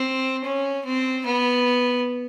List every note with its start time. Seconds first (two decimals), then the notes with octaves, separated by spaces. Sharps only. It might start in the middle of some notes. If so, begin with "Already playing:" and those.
Already playing: C4
0.44 C#4
0.85 C4
1.26 B3